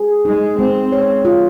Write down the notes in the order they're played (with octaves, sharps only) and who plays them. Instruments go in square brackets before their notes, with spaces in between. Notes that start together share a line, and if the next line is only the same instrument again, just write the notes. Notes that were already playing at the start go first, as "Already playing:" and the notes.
Already playing: [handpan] G#4
[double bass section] G#3 [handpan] D#4
[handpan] G#3 [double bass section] C4
[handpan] C#5
F4